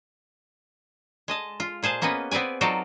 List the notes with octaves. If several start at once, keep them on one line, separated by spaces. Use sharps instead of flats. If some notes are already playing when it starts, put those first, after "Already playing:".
G#3 D#5 A5
F4
A#2 G#4 C5 A5
A#3 B3 C#4 B4 D#5
B3 C4 B4 D5 G#5
F#3 D#4 F4 F#4 A4 D5